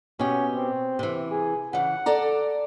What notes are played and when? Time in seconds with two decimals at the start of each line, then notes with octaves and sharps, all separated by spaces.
0.19 B2 C#4 G4
0.54 C4
0.99 C3 E3
1.31 G#4
1.73 C#3 E3 F#5
2.06 A4 D5 A#5